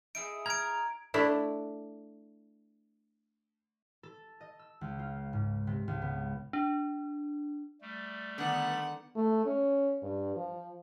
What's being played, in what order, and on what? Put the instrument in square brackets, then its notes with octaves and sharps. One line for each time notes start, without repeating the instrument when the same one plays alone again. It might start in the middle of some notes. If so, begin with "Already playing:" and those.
[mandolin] D#4 E4 G#4 [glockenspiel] D7
[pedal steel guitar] A#5 F6 [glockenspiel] G#6 D7
[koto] A3 D4 E4
[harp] A4
D#5
E6
C#2
F4
G#2
C3
C#2
B3
[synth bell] D4
[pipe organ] G3 A3
[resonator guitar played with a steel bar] D3 D#3 [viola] B3 [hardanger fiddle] F#5
[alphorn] A3
C#4
G2
F3